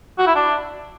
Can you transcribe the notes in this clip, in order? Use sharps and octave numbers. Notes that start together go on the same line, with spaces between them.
F#4
E4
D4